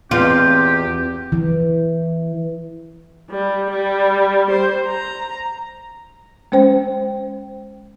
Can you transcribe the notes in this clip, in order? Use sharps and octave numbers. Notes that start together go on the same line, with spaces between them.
E2 C4 F4 G4
E3
G3
G3
C5
A#5
G#3 C#4 C5 G5